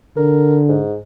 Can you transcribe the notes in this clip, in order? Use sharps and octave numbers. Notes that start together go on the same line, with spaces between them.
D3 A#4
G#2